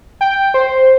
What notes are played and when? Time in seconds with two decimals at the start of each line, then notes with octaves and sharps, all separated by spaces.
0.21 G5
0.54 C5